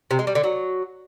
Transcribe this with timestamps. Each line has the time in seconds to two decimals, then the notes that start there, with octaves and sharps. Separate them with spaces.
0.11 C3
0.19 G#3
0.27 G3
0.35 D3
0.44 F#3